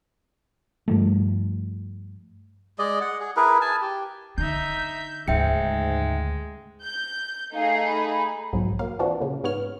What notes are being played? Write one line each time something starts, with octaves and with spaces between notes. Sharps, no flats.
G2 F3 A3
G#3 D5 D#5
F#5
G#4
E4 G#4 A#4 B4
G#5 A5
G4
D3 D#4 E5 G6
D2 G#2 C#3 G#3 E5 G5 C#7
G6
A3 D#4 G#4 F5
B5
B1 F2 G#2 F#3
F#3 A#3 F5
E3 C4 D4 F4 F#4
A#2 C#3
G#2 B3 C#5 F6